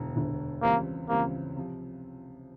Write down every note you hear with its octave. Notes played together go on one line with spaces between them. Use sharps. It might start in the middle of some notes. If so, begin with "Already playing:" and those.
Already playing: E1 D2 D3
E1 D2 D3
C#2 C#3 E3 G3 A#3 C4
C#2 C#3 E3 G3 A#3 C4
C3 F3